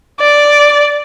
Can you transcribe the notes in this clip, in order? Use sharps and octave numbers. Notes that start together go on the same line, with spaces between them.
D5